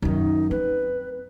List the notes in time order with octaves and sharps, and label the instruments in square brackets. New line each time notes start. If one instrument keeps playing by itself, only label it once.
[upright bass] F#2 D#3 [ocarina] D#4
[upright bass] C4 [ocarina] B4